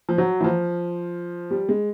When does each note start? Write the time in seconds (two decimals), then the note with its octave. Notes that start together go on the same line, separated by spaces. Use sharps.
0.09 F3
0.18 F#3
0.41 E3
0.44 F3
1.51 G3
1.69 G#3